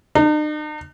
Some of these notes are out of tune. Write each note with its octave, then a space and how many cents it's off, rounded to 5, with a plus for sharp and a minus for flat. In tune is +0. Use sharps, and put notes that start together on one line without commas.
D#4 -45